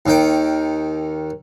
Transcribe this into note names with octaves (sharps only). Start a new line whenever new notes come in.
D#2 D#3 G5